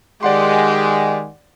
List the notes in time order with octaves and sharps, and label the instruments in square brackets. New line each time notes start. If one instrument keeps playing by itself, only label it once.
[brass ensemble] D#3 G#3 [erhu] G4 [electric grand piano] D5 F#5 C6